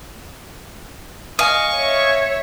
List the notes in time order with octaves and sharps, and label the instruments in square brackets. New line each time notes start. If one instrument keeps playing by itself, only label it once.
[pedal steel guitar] D#5 G#5 D#6 [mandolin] F5 [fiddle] C#6
[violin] C#5 E5